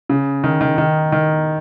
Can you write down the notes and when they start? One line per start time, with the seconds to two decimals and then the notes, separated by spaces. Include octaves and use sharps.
0.09 C#3
0.44 D#3
0.61 D#3
0.78 D#3
1.12 D#3